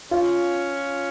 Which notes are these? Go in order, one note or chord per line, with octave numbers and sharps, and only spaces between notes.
C#4 F4